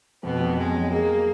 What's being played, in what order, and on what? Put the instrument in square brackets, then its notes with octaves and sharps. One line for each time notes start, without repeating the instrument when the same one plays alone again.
[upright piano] F2 [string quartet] B2 B3
[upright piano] F2
[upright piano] F2 [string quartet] G#3
[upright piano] F#3
[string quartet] A#3 [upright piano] G#4
[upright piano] G#4